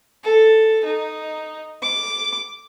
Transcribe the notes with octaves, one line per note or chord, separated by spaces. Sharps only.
A4
D#4
D6